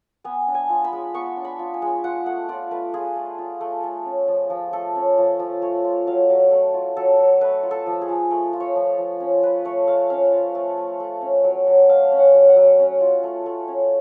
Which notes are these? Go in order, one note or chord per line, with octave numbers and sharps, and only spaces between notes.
B3 G#5
D4
G#5
F4
B5
G#3
B3 C#6
D4
B5
F4
G#5
G#3
F4 F#5
A3 F#5
F4 D5
A3 B4
F4 G#4
A3
F4
A3
A3
C#4
F3
F3
A3 A4
C#4
F3
F3
A3 C#5
F4
F#3 F5
F#3
A3
F4
F#3 A4
F#3
A3 B4
F4
A4
F3
G#4
F3
A3
F4
C#5
F3
F3
C#4
F4 B4
A3 C#5
A3 F5
C#4 F5
F4
A3
A3
A3
C#4
F#3
F#3
A3 F5
C#4
F#5
F#3
F#5
F#3
C#4
F4
A3
A3
C#4